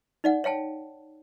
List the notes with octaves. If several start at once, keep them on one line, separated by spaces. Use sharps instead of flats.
D#4 D5 F#5
C#5 F5 G5 A5